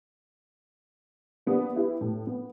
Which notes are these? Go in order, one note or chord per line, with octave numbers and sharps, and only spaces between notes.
A#3 B3 D4 G4
E4 G4 B4
A2
B3